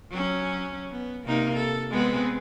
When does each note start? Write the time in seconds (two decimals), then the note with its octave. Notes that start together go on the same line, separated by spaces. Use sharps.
0.10 F#3 C#4
0.91 B3
1.26 C3 A#3 D#4
1.56 A4
1.91 G#3 B3 C4